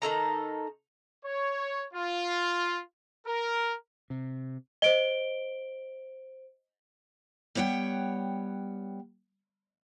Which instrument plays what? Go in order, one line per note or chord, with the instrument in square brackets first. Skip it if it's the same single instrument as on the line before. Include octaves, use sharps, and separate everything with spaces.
[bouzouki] D#3 D#4 A4 A#5
[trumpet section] C#5
F4
A#4
[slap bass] C3
[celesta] C5 D7 G7 [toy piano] D#5
[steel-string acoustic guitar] G3 B3 C#5 F#5 G5